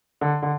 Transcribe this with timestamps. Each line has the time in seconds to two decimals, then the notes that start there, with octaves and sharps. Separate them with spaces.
0.21 D3
0.42 D3